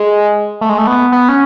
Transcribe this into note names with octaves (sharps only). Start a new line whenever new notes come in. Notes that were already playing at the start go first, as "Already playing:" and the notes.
Already playing: G#3
A3
G#3
A3
B3
B3
C#4